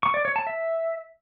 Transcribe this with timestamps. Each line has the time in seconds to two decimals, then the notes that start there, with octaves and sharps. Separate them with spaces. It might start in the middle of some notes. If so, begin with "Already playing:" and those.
0.03 C#6
0.14 D5
0.25 C#5
0.36 A5
0.47 E5